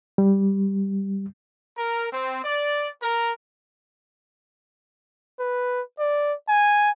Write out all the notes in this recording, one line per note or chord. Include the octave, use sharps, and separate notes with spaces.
G3
A#4
C4
D5
A#4
B4
D5
G#5